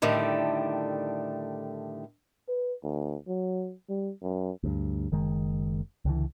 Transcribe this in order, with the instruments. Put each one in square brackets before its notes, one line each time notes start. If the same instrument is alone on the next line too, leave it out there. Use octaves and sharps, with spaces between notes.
[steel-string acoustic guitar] A2 D3 D#3 G3 A3
[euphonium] B4
D2
F#3
G3
F#2
[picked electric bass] D2 G2
F#1 D#3 G#3
C#2 D3 E3